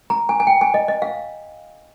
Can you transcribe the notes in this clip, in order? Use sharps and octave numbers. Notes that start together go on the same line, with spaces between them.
A#5
G#5
G#5
G5
G#5
D#5
D#5
F5